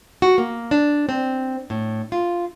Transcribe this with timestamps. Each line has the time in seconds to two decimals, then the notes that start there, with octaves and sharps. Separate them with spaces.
0.22 F#4
0.38 A#3
0.71 D4
1.09 C4
1.70 A2
2.12 F4